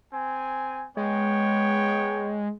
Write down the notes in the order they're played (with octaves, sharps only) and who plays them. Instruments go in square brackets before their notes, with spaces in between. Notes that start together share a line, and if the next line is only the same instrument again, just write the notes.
[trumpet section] C4 G#5
[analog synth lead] G#3 [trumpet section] B3 C#5 G5